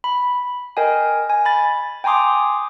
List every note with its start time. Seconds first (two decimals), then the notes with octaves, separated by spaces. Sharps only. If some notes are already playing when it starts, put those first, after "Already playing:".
0.04 B5
0.77 A#4 D#5 G5 G#5
1.30 G#5
1.46 B5 A6
2.04 G5 G#5 A#5 C6 D6 D#6